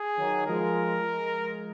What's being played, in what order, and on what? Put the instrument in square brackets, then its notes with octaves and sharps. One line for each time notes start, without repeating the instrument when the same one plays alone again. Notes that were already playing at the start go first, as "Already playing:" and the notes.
Already playing: [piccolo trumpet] G#4
[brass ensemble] D#3 F#3
[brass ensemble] F3 G#3 [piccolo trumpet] A#4
[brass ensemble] F3 G#3